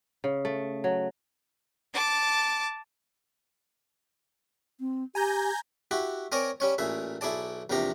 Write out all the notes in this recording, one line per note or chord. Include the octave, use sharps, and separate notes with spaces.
C#3
A3
F#3
A5 D6
C4
G4 G#5 A#5 G6
E4 F#4 G4
C4 A#4 C#5 D5 G#5 A#5
G3 C#4 C#5
A1 A#2 G#4 E5
B1 E4 G#4 D5 A5
A#1 E2 C3 F3 G4 A#5